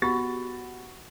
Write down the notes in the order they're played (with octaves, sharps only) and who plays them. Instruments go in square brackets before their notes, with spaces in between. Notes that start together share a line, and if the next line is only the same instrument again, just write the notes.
[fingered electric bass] B3 [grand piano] F#4 [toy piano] G4 [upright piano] B5 A6